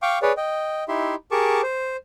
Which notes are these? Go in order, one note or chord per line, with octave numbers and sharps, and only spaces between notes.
F5 G5 C#6 D6
G#4 B4 C#5 D5
D#5 G5
D#4 E4 G4 E5 C6
G4 G#4 A#4 A5 C#6 D6
C5